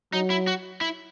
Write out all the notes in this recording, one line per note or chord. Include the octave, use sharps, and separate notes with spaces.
F#3 D#4
E4
F#4
E4